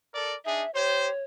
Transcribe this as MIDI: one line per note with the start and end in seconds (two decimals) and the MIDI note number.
0.13 0.34 69
0.13 0.34 70
0.13 0.34 74
0.45 0.63 62
0.45 0.63 63
0.45 0.63 68
0.45 0.71 76
0.74 1.08 67
0.74 1.08 72
0.74 1.23 73